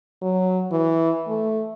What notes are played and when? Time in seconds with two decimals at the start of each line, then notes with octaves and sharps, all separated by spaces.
0.22 F#3
0.72 E3
1.28 A3